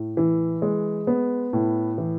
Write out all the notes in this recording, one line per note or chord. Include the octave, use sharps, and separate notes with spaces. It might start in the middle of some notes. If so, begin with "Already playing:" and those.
Already playing: A2
E3
G#3
B3
A2
E3